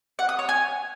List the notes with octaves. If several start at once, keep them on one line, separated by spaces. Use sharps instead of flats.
F#5
D#6
C#5
G#5